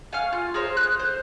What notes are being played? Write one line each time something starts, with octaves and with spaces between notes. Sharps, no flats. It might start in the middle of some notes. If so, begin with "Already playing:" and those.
F5 G#5 C#6 F6
F4
G#4 A#4 C5 C#5
D#6 F#6
C5